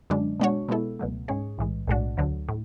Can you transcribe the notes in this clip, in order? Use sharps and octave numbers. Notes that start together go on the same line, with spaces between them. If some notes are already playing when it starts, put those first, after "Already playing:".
F#2 D3 G#3 D4
B2 G#3 D4 F#4 C#5
B2 G#3 B3 E4 A4
C#2 B2 F#3 A3
G#2 G#3 C#4 G#4 C#5
B1 A2 E3 G#3
B1 A2 G#3 D4 F#4
D2 D3 F#3
A2